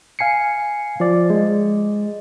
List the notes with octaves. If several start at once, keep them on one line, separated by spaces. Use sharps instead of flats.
F5 G#5 C7 C#7
F3 D5
G#3